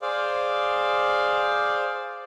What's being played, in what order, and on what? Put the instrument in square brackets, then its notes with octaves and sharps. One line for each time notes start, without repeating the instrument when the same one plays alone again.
[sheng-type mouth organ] G#4 C5 D5 F5